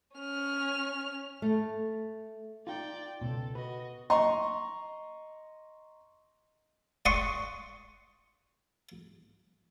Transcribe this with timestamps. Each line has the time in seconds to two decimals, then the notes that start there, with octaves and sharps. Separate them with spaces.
0.17 C#4 F6
1.42 A3
2.67 D#4 F4 D5 G5
3.21 C#2 B2 A4
3.55 F#4 B4 D#5
4.10 D#5 A#5 C6 C#6
7.06 D5 F#5 C6 C#6 D#6